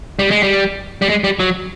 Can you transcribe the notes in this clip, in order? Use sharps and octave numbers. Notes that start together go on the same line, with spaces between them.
G3
G#3
G3
G3
G#3
G3
F#3